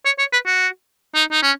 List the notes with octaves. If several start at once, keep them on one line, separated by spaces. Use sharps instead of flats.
C#5
C#5
B4
F#4
D#4
D#4
C#4